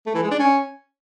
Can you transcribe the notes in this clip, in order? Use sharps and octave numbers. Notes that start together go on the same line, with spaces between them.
A3
E3
G#3
D4
C#4